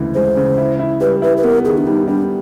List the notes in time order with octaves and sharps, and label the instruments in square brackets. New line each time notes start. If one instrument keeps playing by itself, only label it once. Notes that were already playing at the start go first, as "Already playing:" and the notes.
Already playing: [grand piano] D2 C#3 E3 G#3
[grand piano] G#3 [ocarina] C5
[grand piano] C#3
E4
E4
[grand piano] G3 [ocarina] B4
[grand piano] E4 [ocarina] B4
[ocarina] B4
[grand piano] B3 [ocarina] A#4
[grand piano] D#3 [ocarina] G#4
[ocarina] D4
[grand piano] G3 [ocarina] D#4
[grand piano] G3 [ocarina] D4